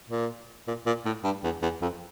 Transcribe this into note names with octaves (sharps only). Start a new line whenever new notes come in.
A#2
A#2
A#2
A2
G2
E2
E2
F2